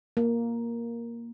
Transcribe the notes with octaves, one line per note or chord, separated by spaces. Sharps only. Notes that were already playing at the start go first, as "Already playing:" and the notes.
A#3